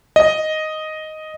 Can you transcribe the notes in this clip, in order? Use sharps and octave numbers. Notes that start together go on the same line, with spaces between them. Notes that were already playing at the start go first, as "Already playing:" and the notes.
D#5